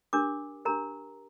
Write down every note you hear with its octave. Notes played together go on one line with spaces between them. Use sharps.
D4 G4 A#4 D6
D4 G4 A#4 A#5